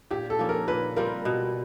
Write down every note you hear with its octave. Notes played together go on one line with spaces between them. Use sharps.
A#2 G4
A4
F3 A#3 C#4
A#4
A#2 B4
G3 C4 F4 A#4
B2